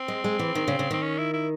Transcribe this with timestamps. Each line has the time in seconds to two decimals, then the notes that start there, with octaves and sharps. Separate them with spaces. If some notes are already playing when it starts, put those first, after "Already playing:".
Already playing: C4
0.08 G#3
0.24 G#3
0.39 E3
0.55 D#3
0.68 C#3
0.79 C#3
0.91 D#3 C4
1.02 C#4
1.18 E4
1.33 E4